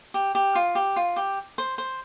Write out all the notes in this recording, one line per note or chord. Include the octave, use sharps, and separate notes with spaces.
G4
G4
F4
G4
F4
G4
C5
C5